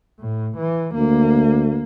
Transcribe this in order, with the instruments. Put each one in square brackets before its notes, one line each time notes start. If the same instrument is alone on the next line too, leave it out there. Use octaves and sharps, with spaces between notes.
[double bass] A2
E3
[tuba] D2 [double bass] A#3